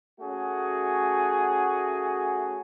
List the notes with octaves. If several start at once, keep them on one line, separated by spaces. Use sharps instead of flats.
A3 C#4 F#4 G#4